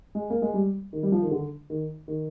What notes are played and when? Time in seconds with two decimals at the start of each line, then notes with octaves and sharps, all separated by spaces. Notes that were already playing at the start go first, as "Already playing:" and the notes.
0.15 G#3
0.30 A#3
0.42 G#3
0.54 G3
0.93 D#3
1.03 G3
1.12 F3
1.22 D#3
1.31 D3
1.70 D#3
2.08 D#3